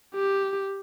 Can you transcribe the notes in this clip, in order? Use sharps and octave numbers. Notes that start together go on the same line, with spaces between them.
G4